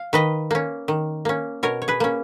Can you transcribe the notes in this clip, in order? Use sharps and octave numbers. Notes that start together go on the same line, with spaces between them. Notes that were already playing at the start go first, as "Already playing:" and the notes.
Already playing: F5
D#3 B4 D#5
A#3 C#4
D#3
A#3 C#4
B2 A#4 C#5
C#5
G#4 B4
A#3 C#4